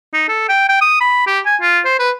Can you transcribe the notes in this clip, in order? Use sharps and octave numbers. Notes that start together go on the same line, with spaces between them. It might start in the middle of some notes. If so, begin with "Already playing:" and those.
D#4
A4
G5
G5
D#6
B5
G4
G#5
F4
C5
B4